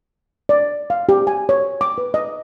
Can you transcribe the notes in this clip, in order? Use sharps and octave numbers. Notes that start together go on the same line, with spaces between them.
D5
F5
G4
G#5
C#5
D6
B4
D#5